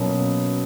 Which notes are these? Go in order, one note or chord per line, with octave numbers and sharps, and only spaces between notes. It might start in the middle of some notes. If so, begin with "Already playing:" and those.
Already playing: B2 F#3 A#3 C#4